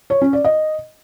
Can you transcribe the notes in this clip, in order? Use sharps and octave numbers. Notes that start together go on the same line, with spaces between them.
C#5
C#4
D5
D#5